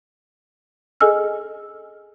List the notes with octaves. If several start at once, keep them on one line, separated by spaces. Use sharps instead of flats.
G#4 A4 D#5 G#5 E6 F6